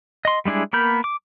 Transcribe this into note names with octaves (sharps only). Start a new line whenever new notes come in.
D#5 C6
G3 G#3 D4 E4 G#4
A#3 B3 A#4 B5 G6
D6